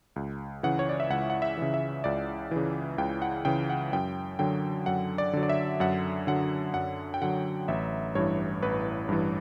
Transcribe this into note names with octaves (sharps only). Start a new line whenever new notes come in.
C#2
C#3 E3 F#5
C#5
D5
E5
C#2 F#5
F#5
E5
C#3 E3
E5
C#2 D5
C#3 E3
C#2 G5
F#5
C#3 E3 G5
F#5
F#2 G5
D3 F#3 G5
F#2 F#5
D5
D3 F#3
D5
E5
F#2 F#5
D3 F#3 F#5
F#2 F#5
G5
D3 F#3 F#5
A1 E5
G2 E3 C#5
A1 B4
G2 E3